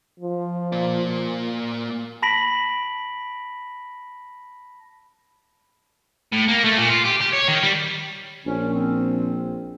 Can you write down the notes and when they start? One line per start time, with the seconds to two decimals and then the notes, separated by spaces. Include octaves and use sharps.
0.20 F3
0.72 A#3 D5
2.22 A5 B5 A#6 B6 D7 F#7
6.33 A2
6.48 A#3
6.64 A3
6.78 A#2
6.89 F4
7.05 G4
7.21 G4
7.33 C#5
7.48 D#3
7.63 G3
8.46 A#1 C#4
8.74 C4